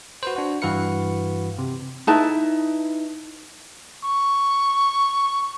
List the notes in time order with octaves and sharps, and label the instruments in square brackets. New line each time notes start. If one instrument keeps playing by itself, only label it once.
[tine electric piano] F#4 B4 C5
D4 F#4
G2 E3 F#4 B4 F5 C#7
C3
[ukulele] D#4 E4 B4 A5
[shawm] C#6